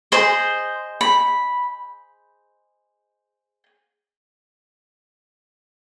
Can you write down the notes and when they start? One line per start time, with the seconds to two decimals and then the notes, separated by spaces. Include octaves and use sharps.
0.12 G#4 C5 D#5 C6
1.01 B5